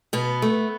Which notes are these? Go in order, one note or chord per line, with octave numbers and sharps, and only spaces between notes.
B2 B3
A3